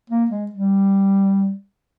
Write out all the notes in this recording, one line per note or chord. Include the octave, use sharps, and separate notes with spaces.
A#3
G#3
G3